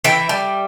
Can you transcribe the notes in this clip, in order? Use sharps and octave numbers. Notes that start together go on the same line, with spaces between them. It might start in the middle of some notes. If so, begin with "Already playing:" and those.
E3 E5 G5
G3